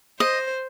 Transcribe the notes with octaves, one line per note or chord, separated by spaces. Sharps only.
C5 D#5